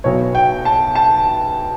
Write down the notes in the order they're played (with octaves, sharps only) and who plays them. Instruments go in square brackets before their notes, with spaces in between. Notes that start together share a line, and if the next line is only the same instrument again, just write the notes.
[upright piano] B1 B2 F#3 C#5
G5
A5
A5